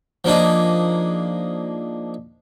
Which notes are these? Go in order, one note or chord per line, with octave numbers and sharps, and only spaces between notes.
F3 A#3 D4 D#4 G#4